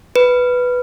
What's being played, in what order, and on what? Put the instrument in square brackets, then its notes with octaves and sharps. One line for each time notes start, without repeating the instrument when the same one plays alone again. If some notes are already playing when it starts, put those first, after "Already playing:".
[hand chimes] B4